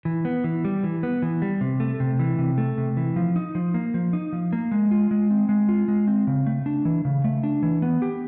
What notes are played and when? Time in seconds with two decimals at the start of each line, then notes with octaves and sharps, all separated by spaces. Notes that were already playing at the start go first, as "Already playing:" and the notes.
0.05 E3
0.25 B3
0.44 E3
0.65 G3
0.84 E3
1.03 B3
1.22 E3
1.42 G3
1.61 C3
1.80 A3
2.00 C3
2.19 E3
2.38 C3
2.58 A3
2.78 C3
2.97 E3
3.16 F3
3.36 D#4
3.55 F3
3.74 A#3
3.94 F3
4.13 D#4
4.33 F3
4.53 A#3
4.72 G#3
4.91 F4
5.11 G#3
5.31 C4
5.49 G#3
5.69 F4
5.88 G#3
6.08 C4
6.27 C#3
6.47 A3
6.66 D4
6.85 E3
7.05 C#3
7.24 A3
7.43 D4
7.63 E3
7.82 B3
8.02 G4